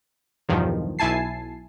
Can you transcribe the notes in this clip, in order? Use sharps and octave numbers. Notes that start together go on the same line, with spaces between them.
B1 E2 G2 D#3 F3
B1 E4 G#5 A5 C7